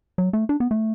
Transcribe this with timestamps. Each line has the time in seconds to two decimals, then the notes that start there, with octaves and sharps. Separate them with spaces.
0.18 F#3
0.33 A3
0.49 D4
0.60 B3
0.71 A3